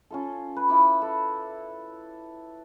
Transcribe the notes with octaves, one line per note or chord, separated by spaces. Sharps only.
C#4 F4 A4
B4
E4 B5 D6
A4